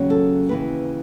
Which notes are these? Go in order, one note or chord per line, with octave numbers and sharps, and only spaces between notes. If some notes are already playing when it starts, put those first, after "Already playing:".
Already playing: D#2 C#3 F#3 C#4
A4
D#2 C#3 E3 B4